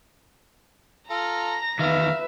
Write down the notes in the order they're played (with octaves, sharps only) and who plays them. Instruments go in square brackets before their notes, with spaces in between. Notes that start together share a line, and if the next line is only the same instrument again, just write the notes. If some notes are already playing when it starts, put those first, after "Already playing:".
[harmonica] F4 A4 [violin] A#5 A#6
[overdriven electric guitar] E2 D#3 [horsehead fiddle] B4 E5 [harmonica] F5